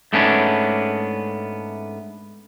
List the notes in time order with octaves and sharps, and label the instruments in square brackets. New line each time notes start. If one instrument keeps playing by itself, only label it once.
[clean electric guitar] G#2 A3 B3 C#4 D4